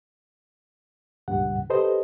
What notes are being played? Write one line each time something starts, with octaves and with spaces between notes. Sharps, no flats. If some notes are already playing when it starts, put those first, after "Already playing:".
C#2 G2 A#2 C#3 G3 F#5
G4 A4 B4 C5 D#5